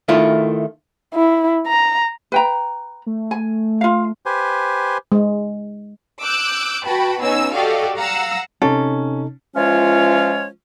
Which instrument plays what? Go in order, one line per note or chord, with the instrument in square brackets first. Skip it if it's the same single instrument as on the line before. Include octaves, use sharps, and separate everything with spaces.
[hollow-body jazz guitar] D#3 A3 E4 F4
[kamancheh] E4
A#5
[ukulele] B4 G5 A#5
[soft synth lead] A3
[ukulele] G#5
F4 F5
[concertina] G4 B4 C5 G#5
[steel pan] G#3
[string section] D6 E6 F#6 G6
F#4 B4 G5 A5 B5
B2 C#4 D#4 G#5 E6
F#4 G4 A4 D5 D#5 F5
F5 F#5 A#5 E6
[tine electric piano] C3 D#4 [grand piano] C#4 [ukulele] A4
[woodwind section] E3 F3 G#3 C#4 F4 C#5